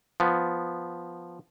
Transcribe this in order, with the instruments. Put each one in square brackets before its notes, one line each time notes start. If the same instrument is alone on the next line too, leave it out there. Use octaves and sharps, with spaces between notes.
[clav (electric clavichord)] F3 B3